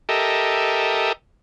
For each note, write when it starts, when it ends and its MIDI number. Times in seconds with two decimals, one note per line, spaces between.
0.09 1.12 67
0.09 1.12 69
0.09 1.12 70
0.09 1.12 75
0.09 1.12 76